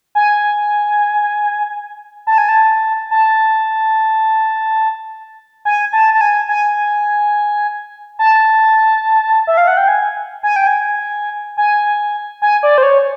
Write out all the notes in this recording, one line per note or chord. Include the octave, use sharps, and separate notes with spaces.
G#5
A5
G#5
A5
A5
G#5
A5
A5
G#5
G#5
A5
E5
F5
F#5
G5
G#5
G#5
G5
G#5
G#5
G#5
D5
C5
C#5